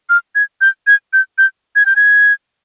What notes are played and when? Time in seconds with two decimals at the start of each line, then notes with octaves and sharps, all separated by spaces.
0.09 F6
0.35 G#6
0.61 G6
0.87 G#6
1.13 G6
1.38 G6
1.76 G#6
1.86 G6
1.96 G#6